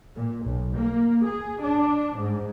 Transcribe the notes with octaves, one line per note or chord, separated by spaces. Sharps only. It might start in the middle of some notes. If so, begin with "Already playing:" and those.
A#2
B1
A#3
G#4
D4
G#2